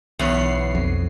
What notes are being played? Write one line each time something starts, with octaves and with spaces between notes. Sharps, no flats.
B1 E2 B3 C#5 C7
F2